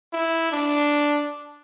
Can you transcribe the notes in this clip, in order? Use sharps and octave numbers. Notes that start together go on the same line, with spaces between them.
E4
D4